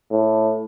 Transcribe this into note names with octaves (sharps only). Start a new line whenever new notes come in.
A2